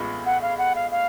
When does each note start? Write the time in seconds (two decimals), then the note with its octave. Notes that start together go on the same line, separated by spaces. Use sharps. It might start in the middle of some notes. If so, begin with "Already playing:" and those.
Already playing: A1 A2 G#3 B3 F4
0.26 F#5
0.42 F5
0.58 F#5
0.75 F5
0.91 F5